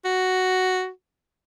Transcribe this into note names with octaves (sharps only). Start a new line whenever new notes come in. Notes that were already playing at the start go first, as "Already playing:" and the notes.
F#4